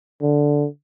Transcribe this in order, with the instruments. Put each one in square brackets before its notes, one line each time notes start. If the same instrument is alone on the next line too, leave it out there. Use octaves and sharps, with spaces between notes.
[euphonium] D3